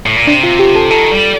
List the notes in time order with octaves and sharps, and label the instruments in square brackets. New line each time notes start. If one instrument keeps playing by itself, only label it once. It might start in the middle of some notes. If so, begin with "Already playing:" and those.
[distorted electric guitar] A2
A#2
[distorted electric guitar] C3 [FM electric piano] D4
[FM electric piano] F4
G4
A4
[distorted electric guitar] D#3 [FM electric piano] A4
[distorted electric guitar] G3